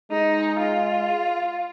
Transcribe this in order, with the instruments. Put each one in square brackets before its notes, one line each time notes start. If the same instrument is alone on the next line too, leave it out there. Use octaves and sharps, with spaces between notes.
[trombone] G#3 [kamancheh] D#4
[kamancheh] F4